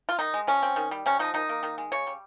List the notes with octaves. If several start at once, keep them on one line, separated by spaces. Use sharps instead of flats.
F4
D#3 D#4
G#3
F3 C#4
C4
D#3
G3
C3 C#4
F3 D#4
D#3 D#4
A#3
D#3
G#3
C#3 C#5
G3